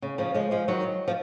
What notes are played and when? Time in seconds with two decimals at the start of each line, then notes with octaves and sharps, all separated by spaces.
0.02 C#3
0.18 C#3 F3
0.34 F3 G#3
0.51 F3 G#3
0.68 D#3 F#3
1.08 F3